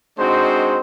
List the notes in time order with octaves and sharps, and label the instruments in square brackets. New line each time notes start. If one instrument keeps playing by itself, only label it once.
[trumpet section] G#3 C4 D4 D#4 F#4 C5